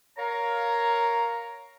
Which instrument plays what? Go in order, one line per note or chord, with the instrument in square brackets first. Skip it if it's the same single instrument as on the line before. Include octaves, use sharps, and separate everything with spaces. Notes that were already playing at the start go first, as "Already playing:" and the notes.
[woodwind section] A#4 C#5 F5 A#5